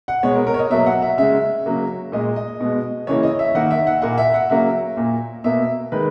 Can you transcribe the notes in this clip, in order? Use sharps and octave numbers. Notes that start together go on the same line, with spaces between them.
F#5
B2 G#3 C#5
A#4
A#4
C#5
D#5
B2 F#3 A#3 E5
F#5
E5
C#3 G#3 E5
C#3 F#3 A#3
A#2 G#3 D#5
D#5
B2 G#3
C#3 E3 A#3 C#5
D#5
E5
D#3 A#3 F#5
E5
F#5
A#2 A#3 F#5
E5
F#5
C#3 F#3 A#3 E5
A#2 A#3
B2 A#3 E5
D#3 G#3 B4